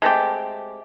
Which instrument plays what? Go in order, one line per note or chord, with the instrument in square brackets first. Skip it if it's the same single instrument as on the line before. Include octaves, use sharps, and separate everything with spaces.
[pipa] G#3 A3 C4 G4